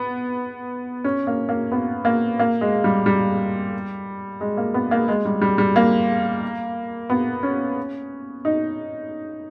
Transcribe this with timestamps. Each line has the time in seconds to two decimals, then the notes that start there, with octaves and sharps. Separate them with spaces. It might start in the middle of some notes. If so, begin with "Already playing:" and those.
Already playing: B3
1.04 C#4
1.27 A#3
1.49 A#3
1.72 B3
2.05 A#3
2.39 A#3
2.61 G#3
2.84 G3
3.06 G3
4.41 G#3
4.57 A#3
4.74 B3
4.91 A#3
5.08 G#3
5.25 G3
5.41 G3
5.58 G3
5.76 A#3
7.10 B3
7.43 C#4
8.45 D#4